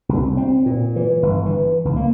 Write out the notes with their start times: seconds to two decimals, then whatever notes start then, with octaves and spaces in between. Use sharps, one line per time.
0.09 C2
0.37 C4
0.66 A#2
0.96 E3
1.23 G1
1.46 E3
1.85 C#2
1.96 A#3